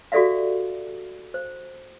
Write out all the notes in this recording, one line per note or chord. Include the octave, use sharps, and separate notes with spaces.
F#4 G4 A4 D5 E5 F5
C5